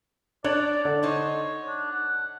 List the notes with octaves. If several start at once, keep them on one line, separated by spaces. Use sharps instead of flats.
D4 C#5 D5
D3
D#4 C5 C#5
D4
F#5